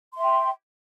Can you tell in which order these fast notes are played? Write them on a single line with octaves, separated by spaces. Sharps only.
C6 E5 G5